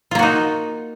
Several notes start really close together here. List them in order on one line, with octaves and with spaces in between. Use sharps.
F4 A#3 F#4 D#4